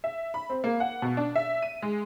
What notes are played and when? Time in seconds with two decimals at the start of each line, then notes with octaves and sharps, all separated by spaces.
0.04 E5
0.34 B5
0.50 C4
0.64 A#3
0.80 F#5
1.02 B2
1.17 D4
1.36 E5
1.62 D#7
1.82 G#3